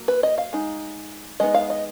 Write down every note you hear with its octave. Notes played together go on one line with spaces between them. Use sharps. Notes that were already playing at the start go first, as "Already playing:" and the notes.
Already playing: F#3 A#3
B4
D#5
F5
G#3 D#4
G#3 B3 D#4 D#5
F5
D#5